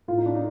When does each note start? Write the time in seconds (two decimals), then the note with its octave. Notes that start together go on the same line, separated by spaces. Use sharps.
0.08 A2 F4
0.18 D#4
0.26 D4
0.35 D#4